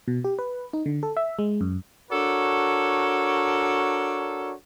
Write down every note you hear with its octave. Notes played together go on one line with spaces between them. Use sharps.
B2
G4
B4
D#4
D3
A4
E5
G#3
F#2
D4 F#4 A4 A#4 C#5